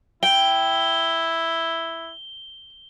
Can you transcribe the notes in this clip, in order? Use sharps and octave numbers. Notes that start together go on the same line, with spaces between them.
E4 G5 G7